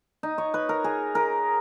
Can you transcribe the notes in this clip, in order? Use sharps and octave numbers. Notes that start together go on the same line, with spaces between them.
D#4
C#5
B4
A#4
G#4
A#4